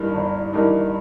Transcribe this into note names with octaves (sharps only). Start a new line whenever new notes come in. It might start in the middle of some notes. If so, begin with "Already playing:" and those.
Already playing: G1 G2 E3 A#3 D#4
G1
G2 E3 A#3 D#4